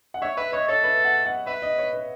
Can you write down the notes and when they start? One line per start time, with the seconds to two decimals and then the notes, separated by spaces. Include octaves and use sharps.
0.14 F#5
0.22 C#5 E5
0.37 B4 E5
0.52 C#5 D#5
0.68 A4 C#5
0.84 B4
1.05 F#5
1.25 F#5
1.47 B4 E5
1.62 D#5
1.78 C#5
1.93 B4